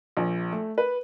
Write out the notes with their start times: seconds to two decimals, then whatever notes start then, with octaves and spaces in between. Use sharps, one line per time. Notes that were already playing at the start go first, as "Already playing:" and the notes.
0.17 A#1
0.52 A3
0.78 B4